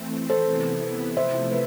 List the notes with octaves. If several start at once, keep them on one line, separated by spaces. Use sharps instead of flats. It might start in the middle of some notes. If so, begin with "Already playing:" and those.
Already playing: E3 A3 C4
A4 C5
C3 E3 B3 E4
C3 F3 A3 E4 C5 E5
B4